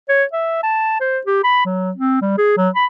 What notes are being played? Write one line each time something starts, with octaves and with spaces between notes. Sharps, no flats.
C#5
E5
A5
C5
G4
B5
F#3
C4
G3
G#4
F#3
B5